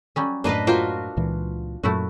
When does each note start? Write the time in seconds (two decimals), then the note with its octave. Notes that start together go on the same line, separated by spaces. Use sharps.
0.16 F#3 G3 C#4
0.44 F#2 A2 A#3 D4 B4 D#5 F5
0.67 A#3 F4 F#4 C5 G5
1.17 C#2 A#2 E3
1.84 F#2 A#2 F#3 A3 E4 F#4